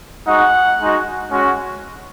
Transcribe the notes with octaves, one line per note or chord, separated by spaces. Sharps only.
G#3 D#4 F#4 F#5
G#3 D#4 F#4
G#3 C#4 F#4